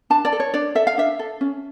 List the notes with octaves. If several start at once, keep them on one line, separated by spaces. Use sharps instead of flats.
D4 A5
D5
A4
C#5
D4 D5
A4 E5
F5
D4 E5
A4
C#4